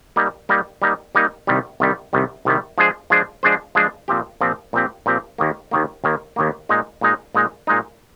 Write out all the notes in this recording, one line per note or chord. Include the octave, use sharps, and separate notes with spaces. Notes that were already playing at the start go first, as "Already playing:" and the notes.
G3 A#3 D#4
G3 A#3 D#4
G3 A#3 D#4
G3 A#3 D#4
C2 C3 D#3 G3
C2 C3 D#3 G3
C2 C3 D#3 G3
C2 C3 D#3 G3
F3 G#3 D4 G#4 C5
F3 G#3 D4 G#4 C5
F3 G#3 D4 G#4 C5
F3 G#3 D4 G#4 C5
A#2 F3 C4 G4
A#2 F3 C4 G4
A#2 F3 C4 G4
A#2 F3 C4 G4
D#2 D#3 A#3
D#2 D#3 A#3
D#2 D#3 A#3
D#2 D#3 A#3
A#2 G#3 D#4
A#2 G#3 D#4
A#2 G#3 D#4
A#2 G#3 D#4